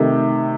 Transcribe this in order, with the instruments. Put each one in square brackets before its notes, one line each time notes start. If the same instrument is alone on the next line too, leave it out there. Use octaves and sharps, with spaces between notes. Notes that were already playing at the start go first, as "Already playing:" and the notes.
Already playing: [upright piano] C3 D#3 A3